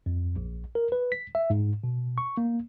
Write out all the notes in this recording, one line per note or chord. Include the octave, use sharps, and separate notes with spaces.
F2
A#1
A#4
B4
B6
E5
G#2
B2
C#6
A#3